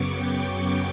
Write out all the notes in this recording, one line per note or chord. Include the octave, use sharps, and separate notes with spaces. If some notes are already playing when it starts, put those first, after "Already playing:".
Already playing: F#2 C#3 F#3 B3 C#6 D6
G5